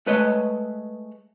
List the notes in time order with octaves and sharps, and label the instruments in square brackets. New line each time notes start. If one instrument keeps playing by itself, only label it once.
[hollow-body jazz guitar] G#3 A3 B4 C#5 D#5